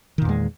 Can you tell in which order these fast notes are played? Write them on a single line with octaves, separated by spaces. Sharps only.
D#3 A#2 E2 G#3